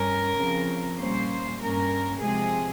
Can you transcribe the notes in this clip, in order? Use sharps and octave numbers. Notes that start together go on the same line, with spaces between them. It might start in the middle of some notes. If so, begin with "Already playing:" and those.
Already playing: G2 C#4 A#4
C#3 F3 C4
A#2 G3 A#3 C#4 C5
G2 G3 A#3 C#4 A#4
C3 F3 G#3 C4 G#4